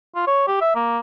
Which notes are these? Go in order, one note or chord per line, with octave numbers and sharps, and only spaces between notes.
F4
C#5
G4
E5
A#3